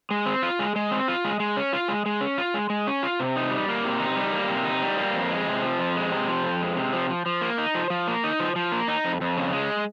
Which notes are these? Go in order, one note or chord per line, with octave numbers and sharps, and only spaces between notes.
G#3
C4
F4
G#3
G#3
C4
F4
G#3
G#3
C#4
F4
G#3
G#3
C#4
F4
G#3
G#3
C#4
F4
C3
D#4
G3
A#3
C3
D#4
G3
A#3
C3
D#4
G3
A#3
F2
G#3
C3
F3
F2
G#3
C3
F3
F2
G#3
C3
F3
F3
F3
A#3
D#4
F3
F3
A#3
D#4
F3
F3
A#3
D#4
F2
F2
C#3
G#3